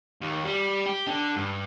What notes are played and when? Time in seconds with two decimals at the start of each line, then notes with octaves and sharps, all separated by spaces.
0.21 D#2
0.45 G3
0.86 G4
1.07 D3
1.36 G2